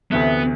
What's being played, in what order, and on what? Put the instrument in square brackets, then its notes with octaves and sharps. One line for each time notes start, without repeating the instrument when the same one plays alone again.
[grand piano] D2 C3 E3 A3 [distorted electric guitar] B3